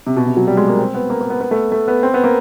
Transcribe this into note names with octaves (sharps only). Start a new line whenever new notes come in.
C3
B2
C3
F#3
G3
G#3
A#3
C4
B3
A#3
A#3
B3
B3
A3
A3
B3
C4
B3
A#3